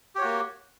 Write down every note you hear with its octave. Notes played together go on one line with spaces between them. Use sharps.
A#3 F#4 G4 C#5